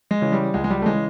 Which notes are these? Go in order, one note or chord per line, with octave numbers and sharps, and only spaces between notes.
G#3
C#3 E3
G3
C#2 G#3
G#3
G3
A3
C#3 E3 G#3